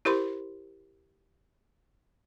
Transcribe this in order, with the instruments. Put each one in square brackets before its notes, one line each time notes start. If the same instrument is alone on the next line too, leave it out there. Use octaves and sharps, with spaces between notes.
[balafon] E4 G4 A#4 C5 B5 C6